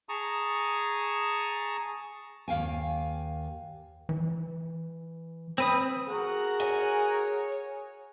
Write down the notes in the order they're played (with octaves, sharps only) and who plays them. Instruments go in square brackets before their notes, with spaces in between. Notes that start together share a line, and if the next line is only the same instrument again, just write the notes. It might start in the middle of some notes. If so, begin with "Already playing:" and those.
[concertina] G#4 A5 A#5 C#6 D#6
[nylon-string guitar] D#2 F5 G5 G#5
[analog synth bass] E3
[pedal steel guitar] C4 B4 D#6
[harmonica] F#4 A#4 F#5 [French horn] G#4
[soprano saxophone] C#5 [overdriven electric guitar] G#5